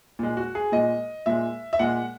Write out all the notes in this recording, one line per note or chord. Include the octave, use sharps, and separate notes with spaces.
A#2 G#3
F#4
G#4
A#2 G#3 D#5
A#2 G#3 E5
E5
A#2 G#3 F#5